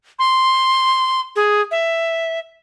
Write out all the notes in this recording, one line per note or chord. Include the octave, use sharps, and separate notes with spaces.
C6
G#4
E5